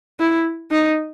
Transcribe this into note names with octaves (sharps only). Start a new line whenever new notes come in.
E4
D#4